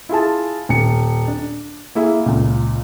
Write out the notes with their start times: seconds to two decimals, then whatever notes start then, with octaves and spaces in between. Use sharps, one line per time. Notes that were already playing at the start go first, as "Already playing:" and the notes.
0.09 E4 F4 G#4 A5
0.69 D#1 C#7
1.28 D4
1.95 A#3 E4 G#4 E5
2.26 C#2 A#2